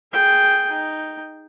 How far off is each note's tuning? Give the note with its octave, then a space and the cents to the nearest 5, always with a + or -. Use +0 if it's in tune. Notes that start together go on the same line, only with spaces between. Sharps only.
G#4 +0 G5 +0
D#4 +0 G5 +0